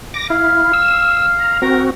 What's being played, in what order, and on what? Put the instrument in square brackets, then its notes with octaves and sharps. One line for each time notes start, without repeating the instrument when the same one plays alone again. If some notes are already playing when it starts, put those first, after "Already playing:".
[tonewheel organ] D6 A#6
[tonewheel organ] E4 [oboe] F5
[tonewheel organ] E6
A#5
[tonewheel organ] C4 F#4 [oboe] A#4